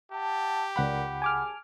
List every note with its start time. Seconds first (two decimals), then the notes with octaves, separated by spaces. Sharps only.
0.11 G4 E5 F#5 A5
0.76 C#2 A2 A#4 D5 F#5 B5
1.22 D#2 G#4 G#5 A5 D6 F6